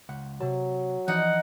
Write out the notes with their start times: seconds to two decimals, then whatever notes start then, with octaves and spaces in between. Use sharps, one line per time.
0.09 C#2 F#5
0.41 C3 F#3 A5
1.08 E3 F3 D#4 D5 F#5